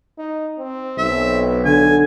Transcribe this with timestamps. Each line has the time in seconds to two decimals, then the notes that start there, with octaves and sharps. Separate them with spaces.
0.18 D#4
0.59 C4
0.98 B1 E5
1.65 D3 G#5